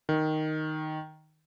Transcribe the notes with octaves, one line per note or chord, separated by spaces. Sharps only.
D#3